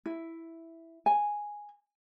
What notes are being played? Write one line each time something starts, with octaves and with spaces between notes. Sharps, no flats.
E4
G#5